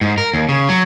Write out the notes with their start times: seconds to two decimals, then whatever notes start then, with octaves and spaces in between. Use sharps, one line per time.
0.01 G#2
0.18 A#4
0.34 D#2
0.49 C#3
0.69 F#3